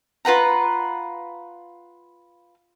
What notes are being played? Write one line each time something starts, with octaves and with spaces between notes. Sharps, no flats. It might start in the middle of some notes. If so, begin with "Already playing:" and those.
F4 B4 F#5 A#5